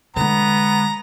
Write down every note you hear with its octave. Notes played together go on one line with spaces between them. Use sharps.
D3 G#3 B3 A#5